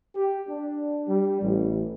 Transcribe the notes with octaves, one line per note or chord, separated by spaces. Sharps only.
G4
D4
G3
A1